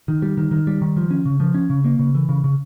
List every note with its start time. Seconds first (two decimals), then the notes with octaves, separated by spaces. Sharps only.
0.08 D#3
0.22 G3
0.38 D#3
0.51 D#3
0.67 G3
0.82 D#3
0.97 F3
1.11 C#4
1.25 C#3
1.40 F3
1.54 C#4
1.70 C#3
1.84 A#3
1.99 C#3
2.15 E3
2.29 C#3
2.44 C#3